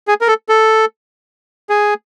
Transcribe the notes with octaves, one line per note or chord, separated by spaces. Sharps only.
G#4
A#4
A4
A4
G#4